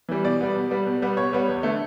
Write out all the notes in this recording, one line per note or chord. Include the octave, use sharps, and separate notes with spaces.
E3 G3
B2 D5
G3 B3
B2
G3 B3
B2
G3 B3
B2 C#5
G3 B3
E2
D3 A3